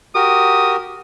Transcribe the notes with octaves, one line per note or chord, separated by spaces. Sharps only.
F#4 G4 A#4 D#6